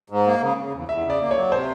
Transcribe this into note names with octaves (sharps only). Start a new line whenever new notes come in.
G#2
A#3
C#3
C#3
E2
E2 E5
C#3
D5
A#3
C#5
F#3
C3 C5